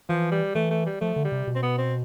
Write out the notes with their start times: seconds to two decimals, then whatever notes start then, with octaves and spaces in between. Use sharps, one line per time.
0.09 E3 F3
0.32 G3
0.55 E3 A3
0.70 A3
0.86 G3
1.01 F3 A3
1.16 D3
1.25 G3
1.32 C3
1.47 B2
1.56 C4
1.63 B3
1.78 C4